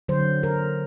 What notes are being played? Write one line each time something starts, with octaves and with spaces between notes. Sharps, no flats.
D3 F#3 C5
A#4